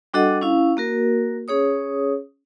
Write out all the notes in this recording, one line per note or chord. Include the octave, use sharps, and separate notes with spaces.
G3 D4 F#4 A4 D#5 F#5
C#4 E4 F5
A#3 F#4 A#4
C#4 G#4 C#5 D#6